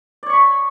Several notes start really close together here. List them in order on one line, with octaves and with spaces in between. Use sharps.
D5 C#5 C#6 B5